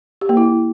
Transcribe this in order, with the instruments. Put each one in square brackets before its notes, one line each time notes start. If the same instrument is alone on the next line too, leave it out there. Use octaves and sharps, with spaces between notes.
[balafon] G4
A#3
E4